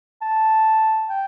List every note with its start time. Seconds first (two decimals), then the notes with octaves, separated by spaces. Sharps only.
0.22 A5
1.09 G5